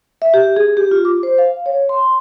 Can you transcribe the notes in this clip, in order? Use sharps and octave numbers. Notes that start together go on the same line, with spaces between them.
E5
G4
G#4
G4
F4
D6
C5
F5
C#5
C6